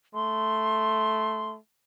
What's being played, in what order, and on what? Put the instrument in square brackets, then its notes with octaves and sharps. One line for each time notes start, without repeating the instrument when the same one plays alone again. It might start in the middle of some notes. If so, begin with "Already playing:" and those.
[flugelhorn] A3 [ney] C6